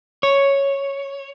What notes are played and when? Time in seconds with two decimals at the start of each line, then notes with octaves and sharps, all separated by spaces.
0.23 C#5